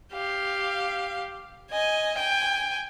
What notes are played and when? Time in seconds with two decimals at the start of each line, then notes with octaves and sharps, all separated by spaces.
0.13 G4 F5
1.71 D#5 G#5
2.18 G5 G#5